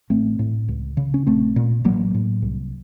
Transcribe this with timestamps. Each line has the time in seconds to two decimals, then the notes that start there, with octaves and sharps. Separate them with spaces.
0.10 A1 A3 C4
0.39 A2
0.68 C#2
0.97 C#3
1.14 C#4
1.27 A#1 A3 C4
1.56 A#2
1.85 A1 F#3 A#3
2.14 A2
2.42 C2